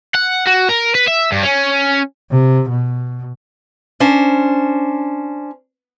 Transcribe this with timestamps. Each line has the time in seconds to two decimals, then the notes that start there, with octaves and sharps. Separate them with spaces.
0.15 F#5
0.47 F#4
0.69 A#4
0.95 B4
1.08 E5
1.32 G2
1.43 C#4
2.31 C3
2.69 B2
4.00 C#4 D4 C5